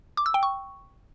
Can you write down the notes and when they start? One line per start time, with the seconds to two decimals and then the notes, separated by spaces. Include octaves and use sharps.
0.17 D6
0.26 E6
0.34 G5
0.43 C#6